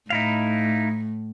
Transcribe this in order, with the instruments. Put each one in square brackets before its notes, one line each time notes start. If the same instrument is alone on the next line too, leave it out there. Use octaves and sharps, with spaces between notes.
[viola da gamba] A2 [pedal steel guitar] D#4 E4 F5